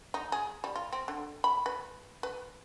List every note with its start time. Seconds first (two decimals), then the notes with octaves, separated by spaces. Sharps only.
0.14 D#4
0.32 G#4
0.64 G3
0.76 F4
0.93 C4
1.08 D3
1.44 B5
1.66 B4
2.23 B4